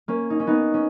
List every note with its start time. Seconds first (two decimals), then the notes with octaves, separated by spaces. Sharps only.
0.08 A#3 C#4
0.30 D#4
0.40 C#4
0.47 B3 D#4
0.74 C#4